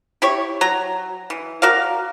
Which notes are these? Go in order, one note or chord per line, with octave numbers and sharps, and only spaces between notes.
E4 G4 C#5
F#3 A#5
E3
F#4 A#4 D5 F5